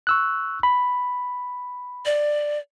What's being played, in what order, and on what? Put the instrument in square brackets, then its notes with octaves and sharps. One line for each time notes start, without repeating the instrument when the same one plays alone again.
[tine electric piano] C#6 E6 F#6
B5
[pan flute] D5